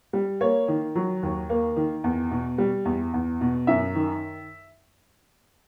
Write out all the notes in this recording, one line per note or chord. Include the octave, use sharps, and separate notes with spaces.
G3
A#3 C#5
D#3
F#3
D#2
A#3
D#3
E2
B2
G3
E2
E2
B2
F#2 E5
D#3